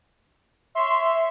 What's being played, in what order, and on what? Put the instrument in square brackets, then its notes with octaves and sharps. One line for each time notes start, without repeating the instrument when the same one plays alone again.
[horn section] C#5 C6 [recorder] E5